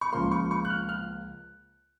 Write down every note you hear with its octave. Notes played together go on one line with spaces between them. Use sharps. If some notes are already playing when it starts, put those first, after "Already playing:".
C#6
C#2 C#3 F3 A#3 C6
C#6
C#6
F#6
F6
F6